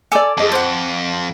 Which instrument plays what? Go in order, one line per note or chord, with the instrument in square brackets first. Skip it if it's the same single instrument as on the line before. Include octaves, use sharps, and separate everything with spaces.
[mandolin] A4 D6 E6 [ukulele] D5 G#5
[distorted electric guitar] F2 [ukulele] G#4 D#5 A5
[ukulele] C5 [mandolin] F#5 D6